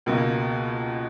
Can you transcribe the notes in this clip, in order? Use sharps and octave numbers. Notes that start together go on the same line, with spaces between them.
C#2 B2 A#3